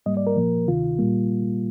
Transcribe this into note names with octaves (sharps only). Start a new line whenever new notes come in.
G#2 G3 A#3 D#5
D5
A#4
A#2 F3 A#3
D2 C3 D#3 F4
A#2 G3 A#3